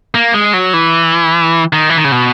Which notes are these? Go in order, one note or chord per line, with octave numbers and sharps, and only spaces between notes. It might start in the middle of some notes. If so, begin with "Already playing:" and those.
A#3
G#3
F#3
E3
D#3
E3
D#3
C#3
B2